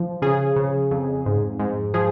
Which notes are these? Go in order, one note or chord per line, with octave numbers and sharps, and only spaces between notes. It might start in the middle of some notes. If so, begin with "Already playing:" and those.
Already playing: F3
C#3 G#4
C#3
F2
G#2
G#2
F3 G#4